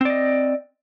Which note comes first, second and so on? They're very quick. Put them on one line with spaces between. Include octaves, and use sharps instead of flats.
C4 D5 D#5